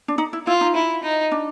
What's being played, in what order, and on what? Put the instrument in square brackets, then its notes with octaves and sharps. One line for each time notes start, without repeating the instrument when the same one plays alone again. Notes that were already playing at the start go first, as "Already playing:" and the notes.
[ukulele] D4
D#4
E4
[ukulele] E4 [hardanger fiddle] F4
[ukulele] D#4
[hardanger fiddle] E4
D#4
[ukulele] D4